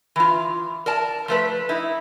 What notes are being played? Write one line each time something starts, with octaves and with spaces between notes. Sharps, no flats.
E3 F4
A#4 D5 A5
F3 A3 B4
D#4 E4